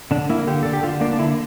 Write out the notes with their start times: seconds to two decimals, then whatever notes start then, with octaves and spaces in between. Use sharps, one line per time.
0.11 D3 D4
0.29 A#3 E4
0.47 D3 G4
0.63 D3 A4
0.73 G4
0.83 D3 F4
1.01 A#3 D4
1.13 D4
1.19 D3 E4